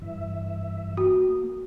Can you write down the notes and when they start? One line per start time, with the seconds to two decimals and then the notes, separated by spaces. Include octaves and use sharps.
0.02 G2 E3 E5
0.97 A#3 F#4